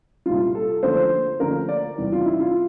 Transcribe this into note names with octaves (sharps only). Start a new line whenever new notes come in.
C2 A#2 G3 F4
A4
D2 D3 F3 A#3 C5
D2 D3 F3 A#3 A#4
D5
E2 C3 E3 G3
F4
E4
F4